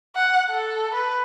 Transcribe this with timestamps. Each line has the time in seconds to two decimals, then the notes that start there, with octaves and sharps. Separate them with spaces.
0.16 F#5
0.51 A4
0.94 B4